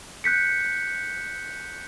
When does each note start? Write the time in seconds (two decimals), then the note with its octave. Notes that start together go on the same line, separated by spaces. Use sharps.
0.24 F#6 G6 B6 C#7